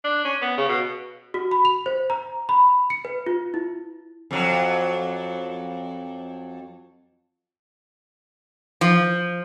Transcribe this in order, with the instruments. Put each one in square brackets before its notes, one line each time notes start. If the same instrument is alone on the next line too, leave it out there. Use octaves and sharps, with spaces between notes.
[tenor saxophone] D4
C#4
B3
C#3
B2
[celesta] F#4
B5
F7
C5
A#5
B5
C#7
B4
F4
E4
[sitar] F2 F#3
[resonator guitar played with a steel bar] F3